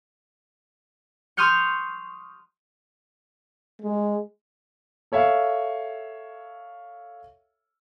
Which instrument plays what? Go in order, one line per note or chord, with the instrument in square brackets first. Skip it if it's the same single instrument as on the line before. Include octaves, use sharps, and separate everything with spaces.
[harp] C6 C#6 D#6 F6 G6 C#7
[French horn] G#3
[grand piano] A4 C#5 E5 F5